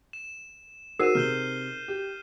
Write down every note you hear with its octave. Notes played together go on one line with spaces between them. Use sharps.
E7
D#4 F#4 G#4 A#4 C5 C7 D#7 E7
C3 F6 G6 G7
G4